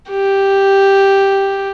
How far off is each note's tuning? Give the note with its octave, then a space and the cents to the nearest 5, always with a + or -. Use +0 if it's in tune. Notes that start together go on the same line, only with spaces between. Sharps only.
G4 +0